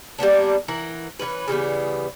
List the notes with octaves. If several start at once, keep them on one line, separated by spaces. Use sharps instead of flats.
G3 A#3 B3 D4
E3 A#4 F#5
E3 G3 C#4 B4
C#3 E3 G3 B3